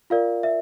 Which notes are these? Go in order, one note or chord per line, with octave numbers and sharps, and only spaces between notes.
F4 A#4 D5 F5
E5